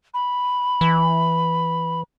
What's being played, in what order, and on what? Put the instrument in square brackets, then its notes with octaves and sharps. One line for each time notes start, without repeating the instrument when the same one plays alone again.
[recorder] B5
[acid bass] E3